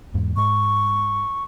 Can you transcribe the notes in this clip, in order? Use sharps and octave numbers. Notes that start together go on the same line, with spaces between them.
E2 G#2
G#2 G#3 C#6